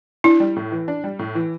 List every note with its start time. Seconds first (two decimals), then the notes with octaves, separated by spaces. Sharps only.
0.24 D4 E4
0.40 G3
0.56 A2
0.72 E3
0.88 D4
1.04 G3
1.19 A2
1.35 E3